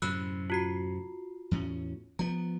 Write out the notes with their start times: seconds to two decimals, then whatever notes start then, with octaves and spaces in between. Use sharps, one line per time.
0.02 F#2 A2 C3 B5 E6 F#6
0.50 F4 F#4 C7
1.51 E2 A2 C#4
2.19 F3 B3 A#5